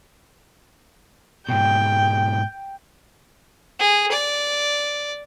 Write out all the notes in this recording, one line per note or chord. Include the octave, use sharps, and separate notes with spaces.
G#2 B2 G5
G#4
D5